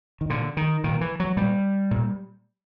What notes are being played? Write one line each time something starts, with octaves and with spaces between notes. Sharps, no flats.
D#3
A#2 D3
D#3
A#2 D#3
E3
F#3
A#2 G3
A#2